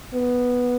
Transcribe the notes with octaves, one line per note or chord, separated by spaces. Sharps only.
B3